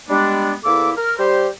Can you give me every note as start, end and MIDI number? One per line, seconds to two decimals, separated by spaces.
0.09 0.54 55
0.09 0.54 56
0.09 0.54 59
0.09 0.54 62
0.65 0.91 40
0.65 0.91 58
0.65 0.91 64
0.65 0.91 69
0.65 0.91 86
0.97 1.18 70
0.97 1.18 89
1.19 1.48 55
1.19 1.48 67
1.19 1.48 72